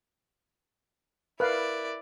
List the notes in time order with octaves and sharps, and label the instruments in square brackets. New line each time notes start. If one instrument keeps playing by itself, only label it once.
[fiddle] E4 D5 [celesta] A#4 F#6 [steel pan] B4 F5